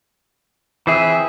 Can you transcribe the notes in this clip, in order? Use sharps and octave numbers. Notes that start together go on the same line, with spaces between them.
E3 C4 E4 G#4 E5